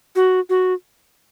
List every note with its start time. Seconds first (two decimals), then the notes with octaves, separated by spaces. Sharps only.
0.16 F#4
0.50 F#4